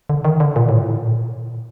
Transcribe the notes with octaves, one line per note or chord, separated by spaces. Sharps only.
D3
D#3
D3
A#2
A2
A#2